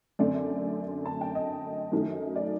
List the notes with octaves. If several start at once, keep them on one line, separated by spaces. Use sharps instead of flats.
F#2 D3 A3 C4 D5
A5
G5
D#5
F#2 D#3 F#3 A3
D5